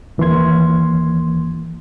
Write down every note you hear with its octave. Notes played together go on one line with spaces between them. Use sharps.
D#2 E3 A#3 C6 G#6